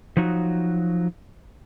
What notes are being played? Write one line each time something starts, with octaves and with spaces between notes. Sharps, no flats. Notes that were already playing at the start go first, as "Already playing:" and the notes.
F3 F#3 D#4 F#4